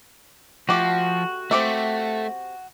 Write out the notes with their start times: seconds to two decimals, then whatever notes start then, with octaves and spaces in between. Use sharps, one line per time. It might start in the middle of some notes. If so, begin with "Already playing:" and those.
0.69 F3 A3 F#4 G4
1.51 A3 C4 G4 E5